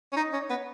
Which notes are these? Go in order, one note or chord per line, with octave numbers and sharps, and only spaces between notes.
C#4
D#4 D#5
C#4
C#5
B3